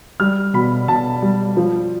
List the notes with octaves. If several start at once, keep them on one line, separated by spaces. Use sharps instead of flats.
G3 F6
B2 B5
B2 A5
G3
F3